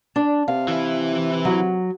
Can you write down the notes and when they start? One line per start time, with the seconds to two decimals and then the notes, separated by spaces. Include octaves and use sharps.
0.16 D4
0.48 C3 F5
0.68 E3 E4
1.45 F#3